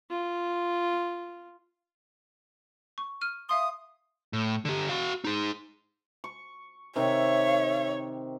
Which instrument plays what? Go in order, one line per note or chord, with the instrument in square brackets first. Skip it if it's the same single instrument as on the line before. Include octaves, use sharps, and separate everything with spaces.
[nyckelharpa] F4
[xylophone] C#6
F6 D#7
[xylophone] E5 F5 C6 [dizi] D#6
[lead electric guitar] A2
D3 G4
F#4 F5
D#4 G#4
[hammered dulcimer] C#6
[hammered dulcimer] C3 D#3 [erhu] C#5 [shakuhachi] E5